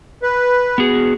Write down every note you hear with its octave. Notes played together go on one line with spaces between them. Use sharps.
B4
B3 F#4 G#4